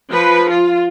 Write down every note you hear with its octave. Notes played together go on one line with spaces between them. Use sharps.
F3 B4
F4